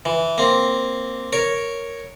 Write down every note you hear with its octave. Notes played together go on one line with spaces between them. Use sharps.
E3
A#3 C4
A#4 C#5